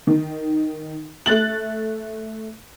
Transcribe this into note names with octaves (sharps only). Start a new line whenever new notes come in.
D#3
A3 F#6 A6 F#7